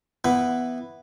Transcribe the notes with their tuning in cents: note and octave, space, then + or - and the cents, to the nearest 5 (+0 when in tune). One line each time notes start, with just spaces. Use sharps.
E3 +0 B3 +0 B5 +0